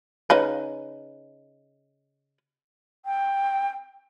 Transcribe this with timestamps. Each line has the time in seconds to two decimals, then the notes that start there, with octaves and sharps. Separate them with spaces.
0.30 C#3 D#4 B4
3.05 G5